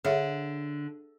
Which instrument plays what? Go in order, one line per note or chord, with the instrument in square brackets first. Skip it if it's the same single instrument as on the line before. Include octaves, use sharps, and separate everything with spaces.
[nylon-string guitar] D3 [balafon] G#4 C#5 E5